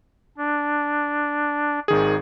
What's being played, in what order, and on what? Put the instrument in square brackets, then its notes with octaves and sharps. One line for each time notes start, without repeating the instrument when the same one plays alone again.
[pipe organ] D4
[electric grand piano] G#1 D#3 G#4